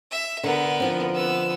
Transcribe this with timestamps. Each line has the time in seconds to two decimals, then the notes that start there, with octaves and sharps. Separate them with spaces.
0.11 E5
0.43 D3 B3 A#4
0.80 D3 F3 C4
1.15 B3 E6